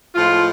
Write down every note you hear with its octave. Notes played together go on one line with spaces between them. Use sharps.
A2 F3 G#3 F4